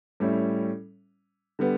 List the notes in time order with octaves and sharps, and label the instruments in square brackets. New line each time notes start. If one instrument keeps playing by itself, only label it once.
[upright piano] A2 G3 C#4 E4
D3 G3 B3